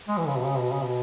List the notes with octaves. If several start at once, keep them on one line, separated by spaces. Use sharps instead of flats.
G#3
E3
C#3
B2
C#3
B2
C#3
B2